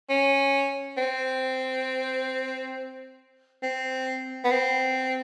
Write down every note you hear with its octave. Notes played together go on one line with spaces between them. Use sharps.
C#4
C4
C4
B3
C4